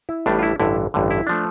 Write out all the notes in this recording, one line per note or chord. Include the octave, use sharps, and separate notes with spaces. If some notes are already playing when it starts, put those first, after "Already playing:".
E4
A1 A2 G3 D4
F4
E4
A1 G2 D3 E4
A1 G2 D3
E4
F3 A3 D4